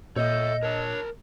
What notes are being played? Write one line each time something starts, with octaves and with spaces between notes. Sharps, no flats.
A#2 A4 C#5 D#5 E5 G6
D4 A#4 C#5 A5